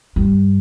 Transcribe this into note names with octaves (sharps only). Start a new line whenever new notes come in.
G2